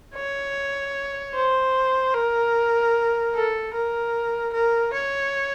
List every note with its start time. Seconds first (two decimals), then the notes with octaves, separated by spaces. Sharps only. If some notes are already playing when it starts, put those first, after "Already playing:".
0.15 C#5
1.35 C5
2.14 A#4
3.35 A4
3.74 A#4
4.53 A#4
4.93 C#5